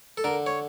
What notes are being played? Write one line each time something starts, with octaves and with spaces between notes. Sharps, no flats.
A4
D3 A#4
C#5